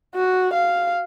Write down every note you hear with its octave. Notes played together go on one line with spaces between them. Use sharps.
F#4
F5